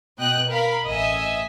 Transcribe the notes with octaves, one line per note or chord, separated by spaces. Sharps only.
B2 D#5 G5 F#6
A#4 F5 B5
A1 D#5 E5 G#5